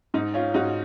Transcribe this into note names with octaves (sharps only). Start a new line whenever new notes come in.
G#2 D#4
C#4 F4
G#2 D#4 F#4